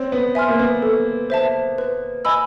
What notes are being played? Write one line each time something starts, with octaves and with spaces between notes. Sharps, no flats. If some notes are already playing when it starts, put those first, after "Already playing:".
Already playing: C4 C#5
B3
E5 G#5 C6 F6
A#3
B3
A4
C5 E5 A5
B4
D#5 G#5 B5 E6